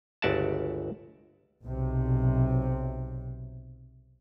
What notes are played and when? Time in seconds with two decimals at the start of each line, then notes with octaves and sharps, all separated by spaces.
0.22 G1 C#2 F#4 D5 E5 A5
1.63 B1 C3